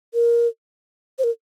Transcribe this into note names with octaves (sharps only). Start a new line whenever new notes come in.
A#4
C5
A#4